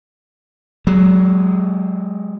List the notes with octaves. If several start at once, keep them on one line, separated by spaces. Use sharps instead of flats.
F#3 G#3